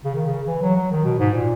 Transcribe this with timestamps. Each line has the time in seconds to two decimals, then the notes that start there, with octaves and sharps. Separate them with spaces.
0.04 C#3
0.15 D#3
0.26 C#3
0.47 E3
0.62 F#3
0.76 F#3
0.91 D#3
1.05 B2
1.19 G#2
1.34 A#2